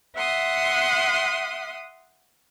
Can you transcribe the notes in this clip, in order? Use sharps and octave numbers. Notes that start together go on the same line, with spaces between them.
E5 F#5 C6 D#6